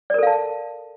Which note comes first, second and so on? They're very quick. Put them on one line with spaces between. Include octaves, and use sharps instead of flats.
D5 A#4 A4 F5 A5